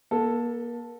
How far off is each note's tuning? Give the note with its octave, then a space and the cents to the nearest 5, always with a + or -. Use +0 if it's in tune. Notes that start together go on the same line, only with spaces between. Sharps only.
A#3 +35 A4 +0